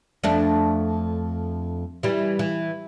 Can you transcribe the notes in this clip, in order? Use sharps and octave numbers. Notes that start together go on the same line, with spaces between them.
F2 A3 D4
E3 G3
E3